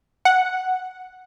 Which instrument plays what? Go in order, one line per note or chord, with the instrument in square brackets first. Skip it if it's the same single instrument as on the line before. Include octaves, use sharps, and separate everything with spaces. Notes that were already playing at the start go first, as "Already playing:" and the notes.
[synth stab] F#5